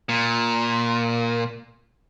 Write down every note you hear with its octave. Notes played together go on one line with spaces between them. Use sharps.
A#2